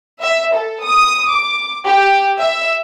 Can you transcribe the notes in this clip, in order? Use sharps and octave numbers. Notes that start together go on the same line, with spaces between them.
E5
A4
D#6
D6
G4
E5